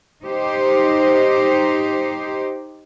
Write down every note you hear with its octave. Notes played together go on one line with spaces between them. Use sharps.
D#4 G4 C5